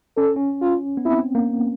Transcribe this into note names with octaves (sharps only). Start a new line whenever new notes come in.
C#4 A4
C#4
F4
B3
C4 E4
A#3